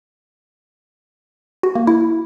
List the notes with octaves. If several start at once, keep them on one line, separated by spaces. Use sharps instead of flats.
F#4
A#3
E4